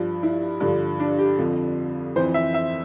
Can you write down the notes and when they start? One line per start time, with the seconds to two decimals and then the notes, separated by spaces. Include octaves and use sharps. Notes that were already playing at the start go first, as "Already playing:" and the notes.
Already playing: G2 F3
0.23 E4
0.60 G2 D3 F3
1.00 D4
1.18 G4
1.39 F2 D3 F3
2.16 E3 C5
2.19 F2
2.34 E5
2.54 E5